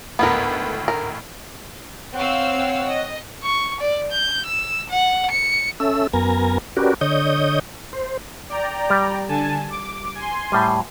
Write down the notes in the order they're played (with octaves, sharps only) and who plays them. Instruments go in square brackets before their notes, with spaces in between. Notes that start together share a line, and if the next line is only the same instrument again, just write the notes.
[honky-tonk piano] G#1 D2 A2 [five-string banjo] B3 A#4
[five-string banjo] A#4
[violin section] C4 F5 E6 [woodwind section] C#5 F#5
[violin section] D#5
[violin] C#6
D5
G6
E6
F#5
C#7
[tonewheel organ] C#4 A4 E5 E6
F#2 B3 A#4 G#5 A#5
C#4 F#4 G4 A#4 B4 D5
D3 C#5 D#5 D#6 G6
C5
[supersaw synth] D5 G5 A#5
[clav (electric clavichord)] G3
[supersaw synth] D3 G#5 A5
D6
G#5 C6
[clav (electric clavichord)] A2 G3